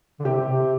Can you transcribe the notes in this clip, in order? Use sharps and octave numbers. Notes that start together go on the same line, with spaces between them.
D3
C3 G4
C3